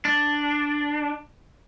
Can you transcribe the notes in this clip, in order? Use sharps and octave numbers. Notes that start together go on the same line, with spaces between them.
D4